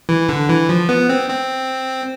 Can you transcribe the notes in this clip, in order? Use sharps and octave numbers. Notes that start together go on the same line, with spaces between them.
E3
D3
E3
F3
B3
C4
C4